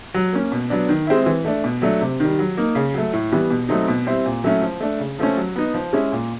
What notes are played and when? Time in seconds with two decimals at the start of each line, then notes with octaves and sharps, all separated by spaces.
0.14 F#3
0.33 A#3 C#4
0.52 B2
0.70 F#3 B3 D4
0.89 D#3
1.07 G#3 C4 E4
1.26 E3
1.45 A3 D4
1.64 B2
1.82 F#3 A3 D4
2.01 C3
2.20 D#3 G3
2.39 F#3
2.57 A#3 D#4
2.75 C#3
2.94 F#3 A3
3.13 A2
3.32 E3 G3 B3
3.51 B2
3.69 F#3 A3 C4 D#4
3.88 B2
4.06 G3 C4 E4
4.26 A#2
4.44 F#3 A3 C#4 E4
4.62 F3
4.81 A3 D4
4.99 C#3
5.19 F3 A3 C#4
5.37 F#3
5.56 B3 D#4
5.74 F3
5.93 G#3 C#4 E4
6.12 A#2